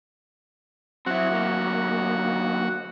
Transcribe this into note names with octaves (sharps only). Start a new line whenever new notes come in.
F#3 C4 E4 F#4
D2 A#3